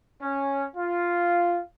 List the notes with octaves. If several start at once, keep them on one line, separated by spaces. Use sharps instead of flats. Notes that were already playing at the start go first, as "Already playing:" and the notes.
C#4
F4